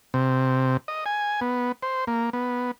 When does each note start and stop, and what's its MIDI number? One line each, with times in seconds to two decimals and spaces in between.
0.14 0.77 48
0.88 1.04 75
1.06 1.40 80
1.41 1.72 59
1.83 2.05 72
2.07 2.30 58
2.33 2.71 59